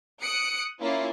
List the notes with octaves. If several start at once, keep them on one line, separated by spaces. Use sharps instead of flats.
D#6 F#6 C#7 D7
A#3 C#4 E4 F4